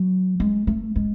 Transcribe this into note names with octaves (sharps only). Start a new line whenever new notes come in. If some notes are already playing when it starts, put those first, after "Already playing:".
Already playing: F#3
G#3
A3
G#3